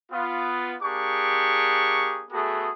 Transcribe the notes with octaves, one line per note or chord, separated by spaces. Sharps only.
B3 F4
A#3 D4 G4 G#4 C#6
A3 B3 F#4 G#4